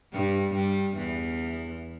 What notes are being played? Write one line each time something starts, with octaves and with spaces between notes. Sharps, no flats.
G2 G3
G2 G3
E2 E3